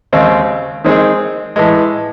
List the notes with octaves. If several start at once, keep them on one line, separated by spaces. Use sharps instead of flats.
D#2 C#3 G#3 C4
D#3 G#3 C4 D#4 G#4
A2 E3 G#3